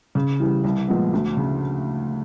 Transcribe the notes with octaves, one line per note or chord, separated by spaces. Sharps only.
C#3
E3 G3
C2
A#2 F3 G#3 B3
D2
C#3